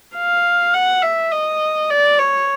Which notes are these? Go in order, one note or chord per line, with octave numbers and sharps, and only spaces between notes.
F5
F#5
E5
D#5
D5
C#5